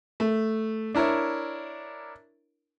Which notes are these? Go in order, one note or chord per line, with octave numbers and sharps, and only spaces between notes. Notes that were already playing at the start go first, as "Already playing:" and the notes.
A3
D4 E4 A#4 C#5